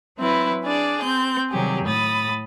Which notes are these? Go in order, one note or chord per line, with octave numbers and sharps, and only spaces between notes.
F#3 C4 E4 B4
D4 G#4 D5
C4 G6
C3 D#3 F#3 G3 G4 G#4
A2 B5 D#6 A6